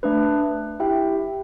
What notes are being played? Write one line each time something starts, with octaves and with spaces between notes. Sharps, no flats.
A3 D4 B4
E4 G4 E5 G5